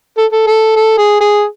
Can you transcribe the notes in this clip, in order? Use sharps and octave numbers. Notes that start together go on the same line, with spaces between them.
A4
A4
A4
A4
G#4
G#4